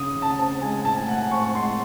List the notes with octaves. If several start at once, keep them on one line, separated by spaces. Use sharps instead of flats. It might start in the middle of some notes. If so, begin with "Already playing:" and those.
Already playing: C#3 D#6
C#3
A5
C4 A5
G#3 G#5
A2 A5
G#5
A2 F#5
A5
C4 C#6
G#3 C6